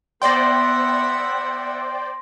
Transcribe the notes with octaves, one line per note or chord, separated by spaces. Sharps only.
B3 C5 D5 E5 F#5 G5 C6 A#6